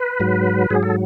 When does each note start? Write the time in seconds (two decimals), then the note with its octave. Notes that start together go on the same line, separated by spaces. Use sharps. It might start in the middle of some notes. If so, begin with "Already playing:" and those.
Already playing: B4
0.20 G#2 F#3
0.70 G#2 F#3 G#4
0.83 A4